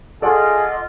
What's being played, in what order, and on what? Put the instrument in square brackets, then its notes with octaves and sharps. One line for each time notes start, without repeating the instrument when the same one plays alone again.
[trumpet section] F4 [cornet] G#4 [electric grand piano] A4 D5 F#5 [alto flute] D#5